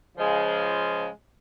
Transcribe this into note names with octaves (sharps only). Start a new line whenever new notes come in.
C#3 F3 G#3